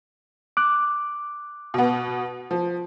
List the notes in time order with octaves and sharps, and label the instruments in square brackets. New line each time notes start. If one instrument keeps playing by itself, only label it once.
[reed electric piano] D6 F#6
[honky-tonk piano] B2 B3
F3